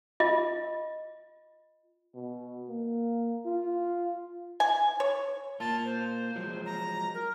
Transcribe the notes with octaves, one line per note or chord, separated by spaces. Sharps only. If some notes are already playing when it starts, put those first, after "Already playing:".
F4 D#5
B2
A#3
F4
G#5
C#5
A#3 F4 A5
C5
F3 F#3 G#3
A#5
A#4